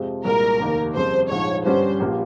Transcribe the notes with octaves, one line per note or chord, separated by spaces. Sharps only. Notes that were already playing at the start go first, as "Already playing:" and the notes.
Already playing: F2 C3 F3 G#3 C4
C2 A#2 G#3 A#4
F1 D#2 D#3 A#3
F2 C#3 G3 C4 C5
A#1 G#2 F3 C#5
G1 G2 G3 C#4 C5
A#1 G3 A#3 F4